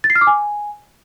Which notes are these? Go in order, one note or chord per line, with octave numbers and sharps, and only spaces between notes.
A6
C7
F6
D6
G#5